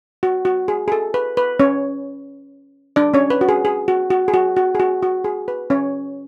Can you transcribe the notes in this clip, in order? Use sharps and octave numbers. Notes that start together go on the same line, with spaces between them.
F#4
F#4
G#4
G#4
A4
B4
B4
C#4 C#5
D4 D5
C#4 C#5
B4
F#4
G#4
G#4
F#4
F#4
G#4
F#4
F#4
G#4
F#4
F#4
G#4
B4
C#4 C#5